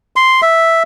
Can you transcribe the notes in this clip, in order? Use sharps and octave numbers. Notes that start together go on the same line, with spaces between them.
C6
E5